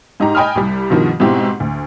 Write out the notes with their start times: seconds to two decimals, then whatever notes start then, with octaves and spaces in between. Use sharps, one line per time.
0.20 G#2 D#4 G4 A#5
0.35 D#5 G5 G#5 B5 D#6 F6
0.56 C2 G3
0.90 G2 B2 D#3 F3
1.20 G#2 B2 C4 E4 G4
1.60 D2